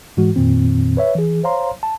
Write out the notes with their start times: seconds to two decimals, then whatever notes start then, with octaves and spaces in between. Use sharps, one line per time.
0.17 G#2 E3 G#3 F#4
0.36 F2 A#2 D#3 C4
0.97 B4 C#5 E5
1.15 E3 G#4
1.44 C5 C#5 F5 A#5 C6
1.83 A5